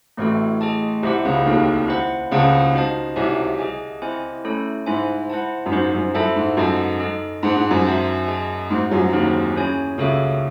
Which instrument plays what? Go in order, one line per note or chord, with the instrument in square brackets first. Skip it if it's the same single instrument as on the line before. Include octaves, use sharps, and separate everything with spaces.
[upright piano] A1 A2 [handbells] A3 C4 F#4 A4
[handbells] G#4 D#5 A5
[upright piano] C2 C3 [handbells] E4 C5 F#5
[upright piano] C#2 C#3
[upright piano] D#2 D#3 [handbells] C4 F#4 A4
[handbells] E4 C5 F#5
[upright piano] C#2 C#3 [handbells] G#4 C5 F#5 A5
[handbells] D#4 F#4 C5 D#5 A5
[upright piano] C2 C3 [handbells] D#4 F#4 C#5 G#5
[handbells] G#4 D#5 G#5
C4 E4 C5 D#5 G#5
A3 C#4 E4 A4 C#5
[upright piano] G#2 [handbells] E4 C5 E5 G#5
[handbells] E4 C5 F#5 A5
[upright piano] F#2
[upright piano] G#2 [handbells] D#4 F#4 C5
[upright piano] F#2
[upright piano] F#2 [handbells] E4 A4 C5 E5 A5
[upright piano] G#2
[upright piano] F#2 [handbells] F#4 A4 D#5 A5
[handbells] D#4 A4 D#5
[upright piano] G#2 [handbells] G#4 C5 F#5 A5
[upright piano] G#2
F#2
[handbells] D#4 F#4 C5 E5 A5
G#4 D#5 A5
[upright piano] G#2 [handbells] A3 C4 F#4 C5
[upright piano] F#2 F#3
[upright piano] D#2 D#3 [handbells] C4 E4 G#4 C5
[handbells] C#4 E4 G#4 C#5 G#5
[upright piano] C#2 C#3 [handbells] F#4 A4 C#5 E5